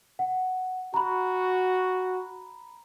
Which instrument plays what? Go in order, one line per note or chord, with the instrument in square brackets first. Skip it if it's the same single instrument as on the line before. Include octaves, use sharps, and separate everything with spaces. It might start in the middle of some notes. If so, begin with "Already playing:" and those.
[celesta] F#5
[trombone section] F#4 [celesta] A#5 B5